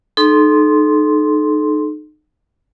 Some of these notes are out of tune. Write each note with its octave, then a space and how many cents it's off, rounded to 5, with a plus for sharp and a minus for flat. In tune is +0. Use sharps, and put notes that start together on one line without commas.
D#4 -30 A4 -35 C6 +0